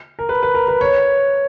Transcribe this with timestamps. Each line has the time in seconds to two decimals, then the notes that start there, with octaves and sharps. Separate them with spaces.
0.19 A#4
0.29 B4
0.43 B4
0.54 A#4
0.68 B4
0.81 C#5